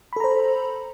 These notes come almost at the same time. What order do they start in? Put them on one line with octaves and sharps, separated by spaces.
B5 A4 A#5 C5